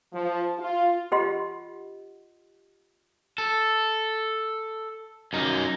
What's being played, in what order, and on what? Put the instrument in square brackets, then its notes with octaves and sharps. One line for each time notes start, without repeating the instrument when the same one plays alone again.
[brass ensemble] F3
F4
[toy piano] F4 G4 D#5 F#5 C6
[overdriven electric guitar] A4
F#2 D#4